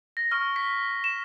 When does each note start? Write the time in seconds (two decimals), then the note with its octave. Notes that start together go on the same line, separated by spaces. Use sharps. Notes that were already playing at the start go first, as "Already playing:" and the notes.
0.17 A#6
0.31 C#6 F6
0.56 B6
1.04 E7